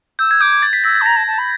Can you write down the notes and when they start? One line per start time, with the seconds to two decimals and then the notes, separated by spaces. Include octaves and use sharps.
0.19 E6 G6
0.31 G#6
0.41 D6 G6
0.52 G#6
0.62 A6
0.73 B6
0.84 E6 A#6
0.95 A6
1.01 A5
1.06 A#5 A#6
1.16 A5
1.27 A5
1.38 B5